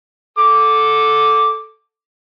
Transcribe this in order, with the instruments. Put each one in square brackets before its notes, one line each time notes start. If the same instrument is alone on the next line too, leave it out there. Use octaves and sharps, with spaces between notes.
[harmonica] A4 D6